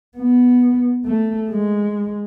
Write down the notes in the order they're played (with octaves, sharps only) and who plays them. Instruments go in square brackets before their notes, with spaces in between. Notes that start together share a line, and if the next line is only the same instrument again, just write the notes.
[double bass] B3
A3
G#3